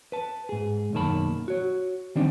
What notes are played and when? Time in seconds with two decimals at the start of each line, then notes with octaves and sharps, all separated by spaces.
0.12 B4 A5
0.49 G#2 G#4
0.93 B1 F#2 D#3 A#3 A5 B5
1.48 F#4 C#5
2.16 D#3 G3 C4 D4 D#4